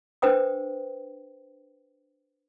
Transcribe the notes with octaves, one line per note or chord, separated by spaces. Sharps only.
D4 B4 C5 G5 D#6